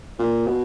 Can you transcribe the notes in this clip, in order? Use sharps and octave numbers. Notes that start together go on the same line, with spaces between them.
A#2
B2